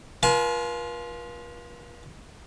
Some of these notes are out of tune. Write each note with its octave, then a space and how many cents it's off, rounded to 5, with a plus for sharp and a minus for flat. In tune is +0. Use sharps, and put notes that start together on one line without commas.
F4 +0 B4 -45 G#5 +45